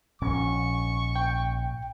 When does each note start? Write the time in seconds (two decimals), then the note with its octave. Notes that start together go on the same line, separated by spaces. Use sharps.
0.22 A#1 G#2 C#4 C#6
1.16 G5